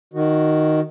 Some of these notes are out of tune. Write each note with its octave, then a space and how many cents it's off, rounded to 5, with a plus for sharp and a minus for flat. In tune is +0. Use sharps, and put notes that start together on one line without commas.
D#3 -5 F#4 +0